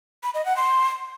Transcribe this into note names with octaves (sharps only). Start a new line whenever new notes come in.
B5
D#5
F#5
C6